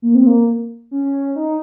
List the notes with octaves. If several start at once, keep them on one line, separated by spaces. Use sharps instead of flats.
A#3
C4
A#3
C#4
D#4